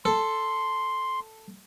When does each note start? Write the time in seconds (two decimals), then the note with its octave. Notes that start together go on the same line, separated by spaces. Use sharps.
0.05 A4 C6